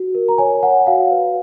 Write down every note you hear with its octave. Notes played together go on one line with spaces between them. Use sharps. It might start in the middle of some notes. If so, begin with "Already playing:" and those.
Already playing: F#4
A#4
A#5
C#5 G#5
C#5 F#5
F#4 F5
B4